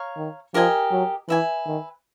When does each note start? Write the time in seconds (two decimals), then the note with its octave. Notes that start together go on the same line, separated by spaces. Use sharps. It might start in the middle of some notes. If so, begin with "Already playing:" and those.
Already playing: C#5 F5 A#5 C#6
0.16 D#3
0.54 F3 G4 A#4 D#5 G#5
0.91 F#3
1.28 E3 B4 E5 G#5
1.66 D#3